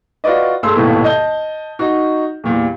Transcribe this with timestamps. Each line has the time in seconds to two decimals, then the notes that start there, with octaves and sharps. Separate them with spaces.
0.24 F4 F#4 B4 D5 D#5
0.63 G2 A3 G#4 C6 E6
0.76 D#1 G#1 D#2 B2 A3 E4
1.04 D#5 A5 G6 G7
1.79 D#4 F#4
2.44 E2 A#2 G3